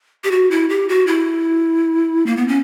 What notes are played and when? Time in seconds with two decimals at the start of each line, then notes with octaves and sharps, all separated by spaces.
0.24 G4
0.31 F#4
0.51 E4
0.70 G4
0.89 F#4
1.07 E4
2.26 A#3
2.37 B3
2.48 C#4